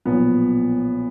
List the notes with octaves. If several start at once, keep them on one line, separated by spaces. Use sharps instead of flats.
B1 A#2 F3 B3